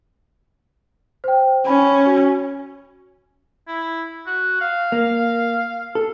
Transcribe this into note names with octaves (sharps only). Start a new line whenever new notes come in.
C5 G5
C#4 B5
F#4
E4
F#4
F5
A#3
A4